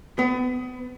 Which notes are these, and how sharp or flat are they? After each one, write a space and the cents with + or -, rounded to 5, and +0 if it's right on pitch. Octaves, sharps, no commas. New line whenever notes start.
B3 +30